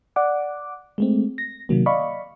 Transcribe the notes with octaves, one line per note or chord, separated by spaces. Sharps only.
D5 F#5 D6
G#3 A3 C4
A#6
C3 D#3 F#3 A#3
D5 D#5 F5 B5 C#6